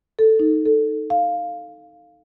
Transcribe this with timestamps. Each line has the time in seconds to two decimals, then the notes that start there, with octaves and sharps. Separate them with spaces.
0.19 A4
0.40 D#4
0.65 A4
1.10 F5